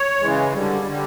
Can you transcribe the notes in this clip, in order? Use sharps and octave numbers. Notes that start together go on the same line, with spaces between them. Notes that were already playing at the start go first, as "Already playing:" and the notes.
Already playing: C#5
C#3 E3 G#3
D3 G3
D3 G3